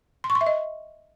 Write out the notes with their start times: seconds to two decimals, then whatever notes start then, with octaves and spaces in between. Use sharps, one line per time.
0.24 C6
0.30 C#6
0.35 C6
0.41 E5
0.47 D#5